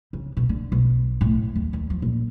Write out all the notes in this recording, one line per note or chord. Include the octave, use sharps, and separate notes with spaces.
C#3
B2
D3
B1
A2
D#2
D#2
F3
A#1